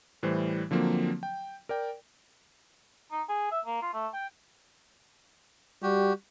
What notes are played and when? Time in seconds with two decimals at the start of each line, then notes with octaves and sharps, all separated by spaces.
0.23 A2 E3 G3 C5
0.71 D3 F3 F#3 A#3 C4
1.23 G5
1.69 A#4 D5 G5
3.11 D#4
3.29 G#4
3.51 E5
3.65 A#3
3.82 F4
3.93 A3
4.13 G5
5.83 G3 F#4 G4